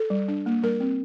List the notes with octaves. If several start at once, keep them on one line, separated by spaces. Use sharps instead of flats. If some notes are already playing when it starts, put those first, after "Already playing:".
Already playing: A4
G3
D4
A#3
G3 A#4
C4